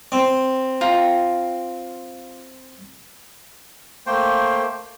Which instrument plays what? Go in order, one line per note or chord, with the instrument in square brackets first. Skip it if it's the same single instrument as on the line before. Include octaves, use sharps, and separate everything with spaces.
[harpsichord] C4
[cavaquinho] F4 G5 A#5
[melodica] A3 A#3 C5 G5